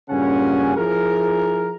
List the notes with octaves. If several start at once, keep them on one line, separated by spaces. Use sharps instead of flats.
G2 A#2 C#3 C#4 F#5 G#5
F3 E4 G#4 A#4